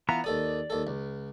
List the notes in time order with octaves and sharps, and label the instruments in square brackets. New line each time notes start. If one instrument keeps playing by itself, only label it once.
[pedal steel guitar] E3 B3 A#5 [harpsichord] F4
[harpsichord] D#2 A4 D#6 [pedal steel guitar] D5
[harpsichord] D#2 A4
C#2